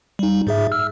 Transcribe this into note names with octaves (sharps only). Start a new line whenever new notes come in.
G3 D#4
G#2 G#4 E5
E6 F6